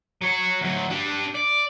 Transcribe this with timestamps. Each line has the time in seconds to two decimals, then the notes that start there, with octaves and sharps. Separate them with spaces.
0.22 F#3 C#5
0.61 D2 F#3
0.90 D4 G4
1.35 D5